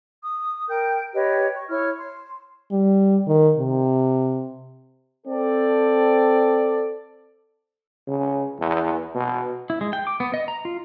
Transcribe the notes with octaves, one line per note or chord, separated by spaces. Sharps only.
D#6
A#4 G5 G6
G4 B4 C#5 D#5
C#6
E4 C#5 C#6 F6
C6
G3
D#3
C3
C4 A4 D5
C#3
E2
B2
E4
G#3
G5
D6
B3
D#5
A#5
F4